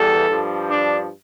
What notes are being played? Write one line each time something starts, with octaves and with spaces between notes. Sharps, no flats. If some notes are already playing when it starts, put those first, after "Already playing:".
Already playing: E2 E3 G3 A4
G2 F3
D4